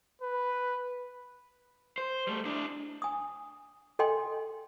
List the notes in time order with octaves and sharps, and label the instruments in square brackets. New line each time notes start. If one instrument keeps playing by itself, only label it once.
[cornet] B4
[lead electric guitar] C5
G3 A3
D4 E4
[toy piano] G#5 D#6
A4 D#5 G5 G#5 C6